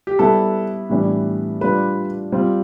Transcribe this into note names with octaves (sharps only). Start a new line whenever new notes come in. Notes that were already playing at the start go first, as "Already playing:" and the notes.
G4
G3 B3 E4 A4
A2 E3 G3 B3 D4
G3 D4 F4 B4
G3 C4 F4